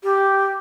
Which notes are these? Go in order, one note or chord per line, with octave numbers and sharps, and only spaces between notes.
G4